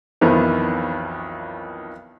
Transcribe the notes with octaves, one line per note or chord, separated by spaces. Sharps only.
B1 F2 D#3 E3 B3